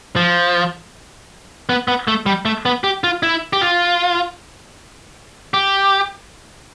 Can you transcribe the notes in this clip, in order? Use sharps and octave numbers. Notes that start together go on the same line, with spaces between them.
F3
B3
B3
A3
G3
A3
B3
G4
F4
E4
G4
F4
G4